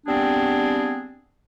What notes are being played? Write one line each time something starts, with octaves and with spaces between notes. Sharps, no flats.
G3 B3 C4 D4 G#4